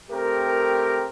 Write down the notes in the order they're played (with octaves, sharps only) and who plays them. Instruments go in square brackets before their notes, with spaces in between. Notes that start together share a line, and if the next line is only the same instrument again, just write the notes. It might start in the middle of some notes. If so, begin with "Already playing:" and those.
[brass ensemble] A3 C4 G4 A#4